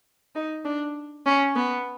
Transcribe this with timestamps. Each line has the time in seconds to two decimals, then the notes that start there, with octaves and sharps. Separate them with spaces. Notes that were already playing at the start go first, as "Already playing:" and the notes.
0.35 D#4
0.65 D4
1.26 C#4
1.56 B3